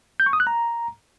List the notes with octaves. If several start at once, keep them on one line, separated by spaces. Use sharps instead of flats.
G6
C#6
D#6
F#6
A#5